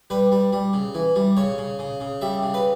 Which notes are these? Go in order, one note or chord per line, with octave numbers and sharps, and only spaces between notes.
G3 B4
G3
G3
C#3
E3
G3
C#3 C#5
C#3
C#3
C#3
G3 E5
C#3
B4